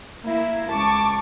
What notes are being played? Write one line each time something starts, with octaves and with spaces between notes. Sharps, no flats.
A#3 E4
C#2 A5 C#6 D6